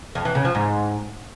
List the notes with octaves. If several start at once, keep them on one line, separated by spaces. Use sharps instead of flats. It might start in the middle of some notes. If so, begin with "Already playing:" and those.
F2
E3
C#3
F3
G#2